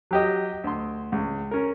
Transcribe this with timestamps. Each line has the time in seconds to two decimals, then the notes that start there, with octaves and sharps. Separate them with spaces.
0.11 F#3 G4 D#5
0.64 D2 C6
1.12 C#2
1.51 C#4 A#4